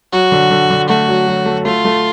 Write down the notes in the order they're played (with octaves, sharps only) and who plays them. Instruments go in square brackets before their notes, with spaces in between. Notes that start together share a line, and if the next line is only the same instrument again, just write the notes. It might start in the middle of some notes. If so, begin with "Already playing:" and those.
[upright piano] F#3 [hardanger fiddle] F#4
[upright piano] D3
D3
D3
[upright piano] A3 [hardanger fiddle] F#4
[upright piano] F#3
F#3
A3
[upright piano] A3 [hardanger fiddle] F4
[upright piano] A3